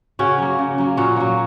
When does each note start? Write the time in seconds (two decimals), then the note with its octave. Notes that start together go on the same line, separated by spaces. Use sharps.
0.19 C#3 C#4 F#4
0.38 F#3 A#3
0.59 C#3
0.78 F#3 A#3
0.97 A#2 C#4 F#4
1.16 F#3 A#3